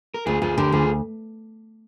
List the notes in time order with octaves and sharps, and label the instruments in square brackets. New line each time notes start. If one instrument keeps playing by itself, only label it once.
[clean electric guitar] A#4
[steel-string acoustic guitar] D2 [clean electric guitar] F4 G#4
[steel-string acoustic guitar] D2 [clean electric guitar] F4 G#4
[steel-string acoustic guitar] D3 [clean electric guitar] G4 A#4
[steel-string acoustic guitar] D2 [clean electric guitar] F4 G#4